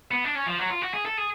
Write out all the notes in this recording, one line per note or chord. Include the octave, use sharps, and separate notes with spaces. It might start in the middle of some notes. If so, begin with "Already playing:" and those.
B3
D4
C#4
F3
F#3
F4
F#4
G#4
A4
G#4